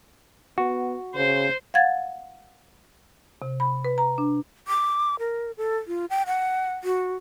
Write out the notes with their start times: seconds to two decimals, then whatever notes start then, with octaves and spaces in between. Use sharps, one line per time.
0.58 B3 F#4
1.15 C#3 C5
1.74 F5 F#5 G#6 A6
3.42 C3
3.60 B5
3.84 B4
3.98 A#5
4.18 D4
4.68 D6
5.19 A#4
5.57 A4
5.87 F4
6.10 G5
6.27 F#5
6.84 F#4